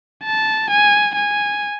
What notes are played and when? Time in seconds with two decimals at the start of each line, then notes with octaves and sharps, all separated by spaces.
0.25 A5
0.70 G#5
1.16 G#5